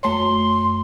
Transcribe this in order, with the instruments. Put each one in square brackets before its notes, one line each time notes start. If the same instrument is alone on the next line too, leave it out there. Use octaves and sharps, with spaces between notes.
[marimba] F#2 A3 C#5 [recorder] C6